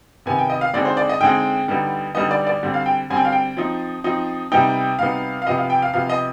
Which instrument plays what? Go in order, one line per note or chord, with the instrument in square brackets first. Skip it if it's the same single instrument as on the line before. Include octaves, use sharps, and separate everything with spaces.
[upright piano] C3 D#3 B3 G#5
G5
D#5
F5
D3 G#3 C4 D#4 D5
C5
D5
D#5
D3 G#3 C4 D#4 G5
D3 G3 B3 D#4
D3 G3 B3 D#4 D#5
D5
D5
D3 G3 C4
F5
G5
D3 G3 C4 G#5
G5
F5
G5
F3 C4 D#4
F3 C4 D#4
C3 G3 B3 D#4 G5
C3 G3 B3 D#4 F5
F5
C3 F3 B3 D#5
F5
G5
F5
C3 F3 B3 F5
D#5